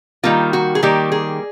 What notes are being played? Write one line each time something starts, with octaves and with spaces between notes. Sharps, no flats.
D#3 G3 A#3 F4
F#4
G#4
D#3 G3 A#3 G4
G#4